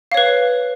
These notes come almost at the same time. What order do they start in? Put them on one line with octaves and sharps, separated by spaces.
F5 C#5 B4